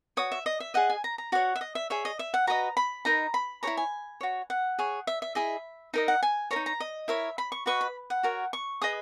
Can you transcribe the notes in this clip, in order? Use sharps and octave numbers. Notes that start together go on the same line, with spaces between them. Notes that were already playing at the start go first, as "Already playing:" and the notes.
F#4 C#5 D#6
E5
D#5
E5
G#4 D#5 F#5
G#5
A#5
A#5
F#4 C#5 F#5
E5
D#5
E5
G#4 C#5 E5
D#5
E5
F#5
F#4 B4 D#5 A#5
B5
D#4 A#4 D#5 A#5
B5
E4 G#4 C#5 A#5
G#5
F#4 C#5
F#5
G#4 C#5
E5
E5
E4 G#4 D#5 E5
D#4 A#4 D#5 E5
F#5
G#5
A#4 C#5 A#5
D#4
A#5
D#5
E4 A#4 C#5 E5
B5
C#6
F#4 B4 D#5 C#6
B5
F#5
F#4 A#4 C#5
C#6
G#4 B4 D#5 D#6